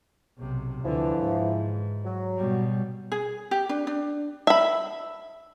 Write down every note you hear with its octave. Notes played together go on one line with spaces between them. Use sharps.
B1 C3
D2 D3 E3 F3
G#2
F#3
B2 G3
G#4
G4
D4
D4
E5 B5